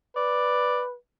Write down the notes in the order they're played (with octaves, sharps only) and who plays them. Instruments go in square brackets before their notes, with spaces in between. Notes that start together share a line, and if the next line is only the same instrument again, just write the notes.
[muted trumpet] B4 [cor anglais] D5